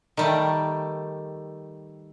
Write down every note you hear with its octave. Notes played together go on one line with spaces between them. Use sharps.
D#3 G3 A3